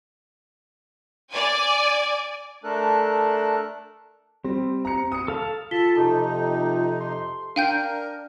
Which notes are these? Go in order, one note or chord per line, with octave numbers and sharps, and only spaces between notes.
D5 G#5
A3 D4 A4 A#4 F#6
G3 C4
A#5 C#7
D#6 C#7
A4 F5 A5
F4 A4 A5 B6 G7
F2 C3 D#4 G4 A4 A5
C6
D4 A#4 F5 G5 G6 D#7